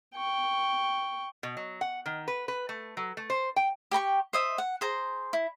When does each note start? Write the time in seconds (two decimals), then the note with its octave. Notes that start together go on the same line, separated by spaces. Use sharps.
0.15 G5 C#6
1.43 B2
1.57 F#3
1.81 F#5
2.06 D#3
2.28 B4
2.48 B4
2.69 A3
2.97 F#3
3.17 A3
3.30 C5
3.56 G5
3.91 G4 G5 A#5 C#6
4.33 C5 D#5 E5
4.58 F#5
4.81 G#4 C5 A#5
5.33 E4